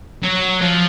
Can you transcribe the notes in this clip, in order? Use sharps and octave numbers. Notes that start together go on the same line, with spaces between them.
F#3
F3